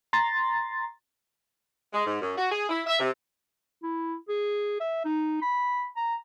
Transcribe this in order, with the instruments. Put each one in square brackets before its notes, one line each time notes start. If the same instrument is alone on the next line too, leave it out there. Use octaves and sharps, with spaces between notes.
[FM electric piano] A#5 C6 A6
[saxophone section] G#3
G#2
F#2
F#4
G#4
E4
E5
C3
[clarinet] E4
G#4
E5
D#4
B5
A#5